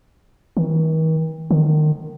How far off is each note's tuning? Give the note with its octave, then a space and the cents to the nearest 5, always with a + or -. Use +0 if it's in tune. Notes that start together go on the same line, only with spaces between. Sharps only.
D#3 +45
D#3 -30